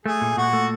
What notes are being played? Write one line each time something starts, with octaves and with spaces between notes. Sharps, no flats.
A3 G#4
A#2
A#2 F#4
A3